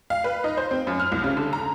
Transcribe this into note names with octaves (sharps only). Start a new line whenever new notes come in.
F5
B4
D#4
C5
C4
F#2
F6
C2
C#3
D3
A#5